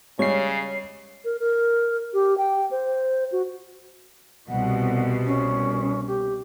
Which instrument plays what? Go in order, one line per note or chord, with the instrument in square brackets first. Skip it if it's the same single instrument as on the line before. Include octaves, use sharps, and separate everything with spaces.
[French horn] C#3 [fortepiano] G3 G#3 [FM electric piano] C#5 C7
[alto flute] A#4
A#4
G4
G5
C5
F#4
[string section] C2 B2 [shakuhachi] F#5
[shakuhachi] C#4
G4